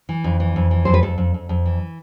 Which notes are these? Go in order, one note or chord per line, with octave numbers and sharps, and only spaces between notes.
E3
F2
E3
F2
E3
F2 C5
B4
F2 A4
F2
F2
F2
E3